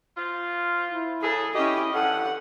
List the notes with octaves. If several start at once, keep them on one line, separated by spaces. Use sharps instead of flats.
F3 F4
E4
C#3 G#4 A4
C#4 E4 G4 D#5
G2 C#4 A4 F#5